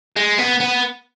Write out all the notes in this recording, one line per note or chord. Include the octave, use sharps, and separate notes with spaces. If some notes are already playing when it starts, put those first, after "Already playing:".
G#3
B3
B3